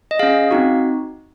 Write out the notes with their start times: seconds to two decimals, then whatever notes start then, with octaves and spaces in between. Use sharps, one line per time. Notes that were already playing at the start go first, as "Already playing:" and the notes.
0.11 D#5
0.19 C#4 G#4 F5
0.51 C4 D#4 F#4